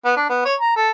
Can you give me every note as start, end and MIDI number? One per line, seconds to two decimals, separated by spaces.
0.05 0.12 59
0.17 0.28 62
0.29 0.41 59
0.46 0.55 73
0.60 0.74 82
0.76 0.91 69